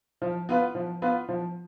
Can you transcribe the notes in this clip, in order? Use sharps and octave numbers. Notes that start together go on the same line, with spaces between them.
F3
B3 F4 B4
F3
B3 F4 B4
F3